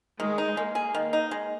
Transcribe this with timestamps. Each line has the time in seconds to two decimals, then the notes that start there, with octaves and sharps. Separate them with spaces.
0.19 D#3 G#3
0.38 D#4
0.56 G#3 A#3
0.75 G#4
0.95 D#3
1.13 D#4
1.31 G#3